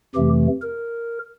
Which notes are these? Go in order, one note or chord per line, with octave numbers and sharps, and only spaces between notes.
F2 C3 E3 A3 G4
A#4